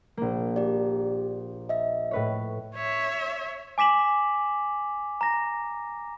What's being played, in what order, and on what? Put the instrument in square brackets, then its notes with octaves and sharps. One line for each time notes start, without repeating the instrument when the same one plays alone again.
[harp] A#1 A#3
[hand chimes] G4 D5
D#5 E5
[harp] A2 B4 C#5
[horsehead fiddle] C#5 E5
[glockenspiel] G#5 D6 B6 E7 F#7
A#5 A#6